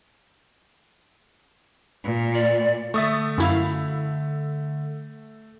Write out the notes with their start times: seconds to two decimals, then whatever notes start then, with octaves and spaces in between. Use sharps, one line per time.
2.04 A#2
2.35 D5
2.94 D3 A3 E5 C#6 D#6 A6
3.38 F#2 E4 F5